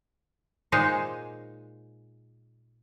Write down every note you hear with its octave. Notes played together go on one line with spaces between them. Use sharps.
A#2 G#3 D#4 C5 C#5